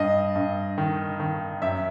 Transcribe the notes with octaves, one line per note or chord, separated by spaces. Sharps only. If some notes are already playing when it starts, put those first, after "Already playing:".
Already playing: G2 D#5
G2
D#3
D#3
F#2 E5